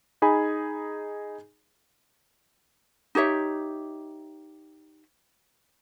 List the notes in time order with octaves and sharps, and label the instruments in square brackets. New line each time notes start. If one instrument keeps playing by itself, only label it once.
[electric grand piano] D#4 G#4 G#5 B5
[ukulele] D#4 G4 C#5 E5